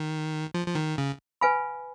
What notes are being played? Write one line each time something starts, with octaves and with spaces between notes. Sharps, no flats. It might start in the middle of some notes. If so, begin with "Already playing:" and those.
Already playing: D#3
F3
F3
D#3
C#3
B4 F5 G#5 B5